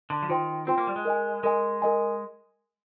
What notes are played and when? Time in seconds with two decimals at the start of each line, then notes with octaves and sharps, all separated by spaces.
0.10 D3
0.22 F3
0.29 D#3 F4 C5 G5 C6
0.67 C4 F4 C5 G5 C6
0.78 A#3
0.87 G3
0.96 G#3
1.05 A#4 D#5 G#5
1.43 G#3 A#4 D#5 G#5
1.82 A#4 D#5 G#5